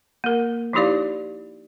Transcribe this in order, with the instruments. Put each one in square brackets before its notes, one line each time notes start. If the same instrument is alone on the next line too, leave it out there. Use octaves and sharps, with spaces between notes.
[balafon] A#3 A#4
F3 D#4 E4 G4 D5 F5